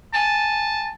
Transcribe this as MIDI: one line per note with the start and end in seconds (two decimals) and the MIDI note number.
0.14 0.89 80
0.14 0.92 81